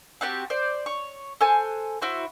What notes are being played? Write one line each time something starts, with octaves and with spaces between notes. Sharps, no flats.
C4 F#4 G4 A5
C5 D5
C#5
A4 C5 G#5 F#6
E4 F#4 C5